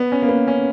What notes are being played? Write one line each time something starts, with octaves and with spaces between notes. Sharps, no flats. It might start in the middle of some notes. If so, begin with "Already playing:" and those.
Already playing: B3
C#4
A#3
B3
C#4